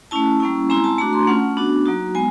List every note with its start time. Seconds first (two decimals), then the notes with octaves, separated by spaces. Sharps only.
0.11 A3 C#4 E4 A5
0.40 G3 A#3 C#4 E4
0.69 G#3 C4 E4 A#5
0.84 A5
0.98 A3 A#5
1.01 D4 F#4
1.13 C6
1.27 A3 C#4 F4 F#5
1.57 B3 D4 F#4
1.86 F#3 A#3 D#4 F#4
2.15 G#3 B3 G#5